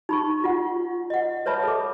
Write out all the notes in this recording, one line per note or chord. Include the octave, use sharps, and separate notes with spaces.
D#4 B5 C#6
F4 F#5
D#5 F#5
B4 C#5 E5 A5 B5
A4 D6